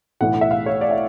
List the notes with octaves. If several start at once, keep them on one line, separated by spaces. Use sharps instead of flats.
B1 A2 E3 F#5
E5
F5
C#5
D5
E5